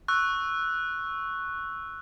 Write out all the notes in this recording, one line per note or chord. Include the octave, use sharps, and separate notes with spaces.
C#6 E6 F#6